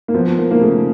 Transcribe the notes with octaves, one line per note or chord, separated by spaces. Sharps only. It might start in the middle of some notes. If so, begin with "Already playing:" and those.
A#3
F3 B3
A#3
A#3
C#3 A3